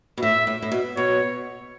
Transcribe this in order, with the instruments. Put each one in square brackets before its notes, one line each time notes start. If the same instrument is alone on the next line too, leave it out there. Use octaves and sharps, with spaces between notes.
[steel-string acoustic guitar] B2
[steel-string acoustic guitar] A2 [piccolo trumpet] E5
[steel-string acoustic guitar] A2
A2
B2
[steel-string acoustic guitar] B2 [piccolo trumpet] C#5